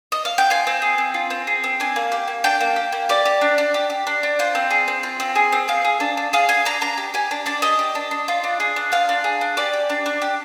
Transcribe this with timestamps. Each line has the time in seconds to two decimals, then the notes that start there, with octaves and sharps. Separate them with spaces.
0.12 D#5
0.25 F5
0.38 G5
0.50 F4 G#5
0.67 C4
0.82 G#4
0.98 C4
1.14 F4
1.30 C4
1.47 G#4
1.64 C4
1.80 D4 G#5
1.96 A#3
2.12 G4
2.28 A#3
2.44 D4 G5
2.61 A#3
2.76 G4
2.92 A#3
3.09 G4 D5
3.25 G4
3.41 D4
3.58 D4
3.74 G4
3.90 G4
4.07 D4
4.23 D4
4.39 F4 C5
4.55 C4
4.71 G#4
4.88 C4
5.03 F4
5.20 C4
5.35 G#4
5.52 C4
5.68 G#4 F5
5.85 G#4
6.00 D4
6.17 D4
6.33 G#4 F5
6.49 G#4 G#5
6.65 D4 A#5
6.81 D4 A#5
6.98 G4
7.14 G4 G#5
7.31 D4
7.46 D4 D5
7.62 G4 D#5
7.79 G4
7.95 D4
8.11 D4
8.28 F4
8.44 D4
8.60 G#4
8.76 D4
8.92 F4 F5
9.09 D4
9.24 G#4
9.41 D4
9.57 G4 D5
9.73 G4
9.90 D4
10.06 D4
10.22 G4